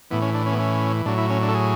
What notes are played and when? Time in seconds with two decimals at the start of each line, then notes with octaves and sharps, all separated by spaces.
0.11 A2 E3 B3
0.22 C#4
0.34 D4
0.46 C#4
0.52 B3
0.59 C#4
1.06 A2 F#3 D4
1.18 E4
1.30 C#4
1.43 D4
1.48 A4
1.55 G#4